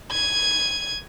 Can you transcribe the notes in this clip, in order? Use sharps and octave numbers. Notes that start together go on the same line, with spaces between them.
G#6 D#7